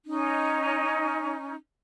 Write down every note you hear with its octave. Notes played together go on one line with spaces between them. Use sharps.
C#4 D#4